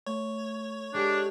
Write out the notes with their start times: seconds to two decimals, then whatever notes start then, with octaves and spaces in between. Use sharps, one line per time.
0.06 A3 C#5
0.94 G#3 D4 G4 A4